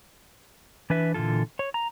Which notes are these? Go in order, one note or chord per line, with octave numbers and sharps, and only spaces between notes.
E3 D4 B4 E5
A#2 D3 E3 F4 A4
C#5
A#5